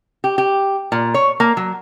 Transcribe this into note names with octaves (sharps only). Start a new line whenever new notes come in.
G4
G4
A#2
C#5
A#3
F#3